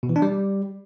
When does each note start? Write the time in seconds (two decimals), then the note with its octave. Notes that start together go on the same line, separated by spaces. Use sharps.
0.03 B2
0.09 E3
0.16 D4
0.22 G3